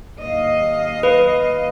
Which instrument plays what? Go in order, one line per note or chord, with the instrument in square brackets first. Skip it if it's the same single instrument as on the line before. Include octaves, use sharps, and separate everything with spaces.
[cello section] D#2 D#5 F5
[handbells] B4